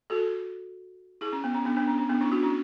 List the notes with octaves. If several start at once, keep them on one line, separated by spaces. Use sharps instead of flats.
F#4 A4
E4 G#4
C#4
B3
C#4
B3 D4
B3 D4
C#4
C#4
B3 D4
C#4 E4
D4 F#4
C#4 E4